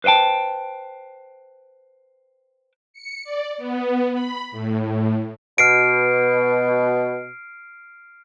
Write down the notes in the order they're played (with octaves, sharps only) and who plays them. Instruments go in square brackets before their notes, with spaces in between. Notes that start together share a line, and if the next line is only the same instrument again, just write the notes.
[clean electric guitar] B4 C5 D#5 G5 A5
[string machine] C#7
D5
B3
B5
A2
[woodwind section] B2 [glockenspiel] F6 C7 D7